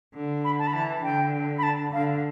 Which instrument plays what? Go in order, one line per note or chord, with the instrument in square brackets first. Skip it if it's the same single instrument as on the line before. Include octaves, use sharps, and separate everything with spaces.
[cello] D3
[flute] B5
A5
B5
[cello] E3 [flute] A5
[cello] D3 [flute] G5
[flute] B5
A5
[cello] D3 [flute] F5